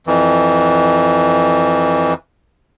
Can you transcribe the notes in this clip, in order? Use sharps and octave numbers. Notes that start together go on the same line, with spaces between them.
F2 E3